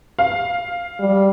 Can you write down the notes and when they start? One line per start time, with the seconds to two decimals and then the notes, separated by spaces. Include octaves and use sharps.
0.19 F5
1.00 G3